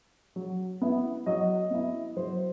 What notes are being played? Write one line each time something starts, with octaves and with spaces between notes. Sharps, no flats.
F#3
B3 E4
F#3 D#5
B3 E4
F#3 C5